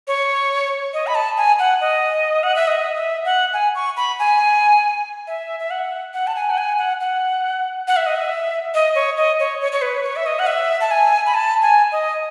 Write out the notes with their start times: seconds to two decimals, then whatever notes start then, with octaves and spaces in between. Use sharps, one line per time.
0.07 C#5
0.93 D#5
1.07 B5
1.15 A5
1.37 G#5
1.59 F#5
1.81 D#5
2.43 F#5
2.56 E5
2.67 D#5
2.96 E5
3.25 F#5
3.53 G#5
3.75 C#6
3.97 B5
4.19 G#5
5.27 E5
5.60 E5
5.71 F#5
6.14 F#5
6.27 A5
6.36 G#5
6.50 F#5
6.58 G#5
6.78 F#5
7.01 F#5
7.88 F#5
7.97 E5
8.06 D#5
8.16 E5
8.74 D#5
8.95 C#5
9.17 D#5
9.40 C#5
9.61 C#5
9.72 C#5
9.82 B4
10.03 C#5
10.16 E5
10.26 D#5
10.39 F#5
10.47 E5
10.81 A5
10.91 G#5
11.26 B5
11.34 A5
11.62 G#5
11.92 D#5